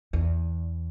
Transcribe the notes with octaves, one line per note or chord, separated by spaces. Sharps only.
E2